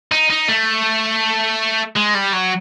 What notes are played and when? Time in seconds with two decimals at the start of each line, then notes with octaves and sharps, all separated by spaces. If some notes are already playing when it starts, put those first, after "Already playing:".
0.12 D#4
0.30 D#4
0.49 A3
1.96 G#3
2.15 G3
2.33 F#3